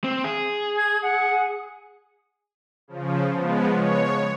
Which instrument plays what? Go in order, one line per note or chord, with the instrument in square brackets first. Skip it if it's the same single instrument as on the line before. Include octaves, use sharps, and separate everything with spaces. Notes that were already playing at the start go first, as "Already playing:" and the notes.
[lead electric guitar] C4
G#4
[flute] G#6
F#5
[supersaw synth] C#3 F3
F3 G#3 B3
C#5